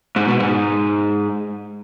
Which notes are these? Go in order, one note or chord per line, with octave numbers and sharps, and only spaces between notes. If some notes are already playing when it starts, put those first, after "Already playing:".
G#2
B2
G#2